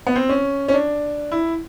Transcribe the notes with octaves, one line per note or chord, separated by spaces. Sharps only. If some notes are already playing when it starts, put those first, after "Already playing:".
B3
C4
C#4
C#4
D4
E4